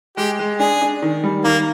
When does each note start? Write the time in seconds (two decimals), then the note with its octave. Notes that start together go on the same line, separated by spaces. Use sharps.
0.17 G#3 G4
0.39 G#3
0.59 D4 G#4
0.81 D4
1.02 D#3
1.24 G3
1.45 D#3 A#3